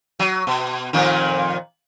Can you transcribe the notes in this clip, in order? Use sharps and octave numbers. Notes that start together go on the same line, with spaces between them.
F#3
B2
F2 A#2 D#3